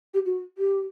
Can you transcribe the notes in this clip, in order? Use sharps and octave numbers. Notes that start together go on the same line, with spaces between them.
G4
F#4
G4